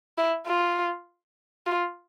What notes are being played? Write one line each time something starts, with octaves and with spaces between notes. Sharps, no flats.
E4
F4
F4